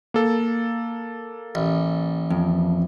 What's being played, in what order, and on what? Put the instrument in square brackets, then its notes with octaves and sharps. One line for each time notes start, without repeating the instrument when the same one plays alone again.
[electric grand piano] A#3 A4
[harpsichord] A1
[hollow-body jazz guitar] F2